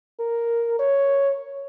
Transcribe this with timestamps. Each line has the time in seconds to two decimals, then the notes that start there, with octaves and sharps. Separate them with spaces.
0.19 A#4
0.79 C#5